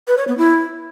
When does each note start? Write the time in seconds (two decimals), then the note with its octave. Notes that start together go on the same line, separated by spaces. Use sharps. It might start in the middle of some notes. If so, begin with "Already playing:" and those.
0.07 B4
0.18 C#5
0.28 B3
0.38 E4